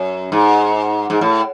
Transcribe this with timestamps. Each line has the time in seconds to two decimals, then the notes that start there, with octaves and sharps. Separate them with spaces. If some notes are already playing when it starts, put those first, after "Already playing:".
Already playing: F#2
0.32 G#2
1.10 G#2
1.21 A2